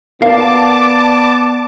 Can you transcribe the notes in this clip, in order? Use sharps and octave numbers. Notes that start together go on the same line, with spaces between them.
B3 A#4 D5 F5 A5 D6